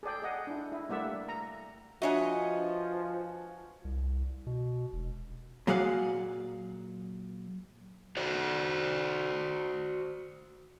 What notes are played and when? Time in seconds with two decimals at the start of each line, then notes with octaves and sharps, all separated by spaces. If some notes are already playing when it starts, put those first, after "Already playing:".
0.03 G#4 A4 D5 G5
0.22 G#4 D#5 F#5
0.47 D4 E4
0.72 E4
0.89 G3 A3 A#3 D5 E5 F#5
1.29 A#5
2.02 F3 D4 F#4 B4 C#5 D#5 E5 G#5
3.85 C2
4.47 B2
4.93 E1
5.67 A#2 F#3 G#4 F5 F#5
8.17 F#4 C5 D5